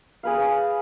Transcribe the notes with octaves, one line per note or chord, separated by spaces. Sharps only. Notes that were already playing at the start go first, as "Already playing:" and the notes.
G#4 B4 F5